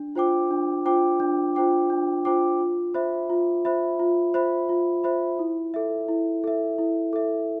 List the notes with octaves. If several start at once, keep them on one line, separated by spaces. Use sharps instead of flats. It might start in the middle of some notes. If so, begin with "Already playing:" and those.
Already playing: D4
F4 C5 G5 D6
D4
F4 C5 G5 D6
D4
F4 C5 G5 D6
D4
F4 C5 G5 D6
F4
C5 E5 B5
F4
C5 E5 B5
F4
C5 E5 B5
F4
C5 E5 B5
E4
A4 E5
E4
A4 E5
E4
A4 E5